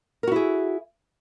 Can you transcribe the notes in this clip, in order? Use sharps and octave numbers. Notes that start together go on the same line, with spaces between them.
E4 F#4 G#4 A#4